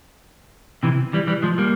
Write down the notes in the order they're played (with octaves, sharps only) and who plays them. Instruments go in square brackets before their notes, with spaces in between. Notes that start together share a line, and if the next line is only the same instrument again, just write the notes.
[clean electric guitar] C3 E3
E3 G3
E3 G3
F3 G#3
G3 A#3